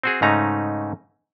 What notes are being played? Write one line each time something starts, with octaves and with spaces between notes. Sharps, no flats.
C4 F#4 G#4
G#2 C#3 A3 C#4 D#4 A#5